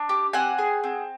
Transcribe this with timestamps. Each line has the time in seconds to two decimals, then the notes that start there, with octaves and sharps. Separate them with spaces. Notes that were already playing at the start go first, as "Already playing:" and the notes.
Already playing: D4
0.09 G4
0.33 C4 F#5 G#5
0.58 G#4
0.84 C4